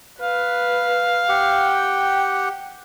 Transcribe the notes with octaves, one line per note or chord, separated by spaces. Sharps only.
B4 F5
G4 F#5 G5